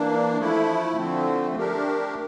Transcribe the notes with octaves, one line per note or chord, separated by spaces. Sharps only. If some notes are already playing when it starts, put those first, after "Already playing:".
Already playing: E3 A#3 D4
F3 A3 E4
D3 F3 A3 C4
A3 D4 G4 A#4